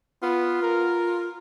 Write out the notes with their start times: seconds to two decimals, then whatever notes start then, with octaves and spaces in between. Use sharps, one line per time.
0.22 B3 F4
0.63 A#4